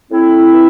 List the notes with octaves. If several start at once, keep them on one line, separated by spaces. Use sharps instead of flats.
A2 C4 E4
E3